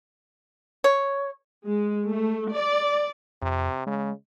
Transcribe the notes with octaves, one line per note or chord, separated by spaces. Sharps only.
C#5
G#3
A3
D5
F2 C3
C#3 G#3